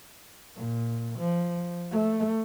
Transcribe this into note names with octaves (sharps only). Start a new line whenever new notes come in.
A#2
F3
A3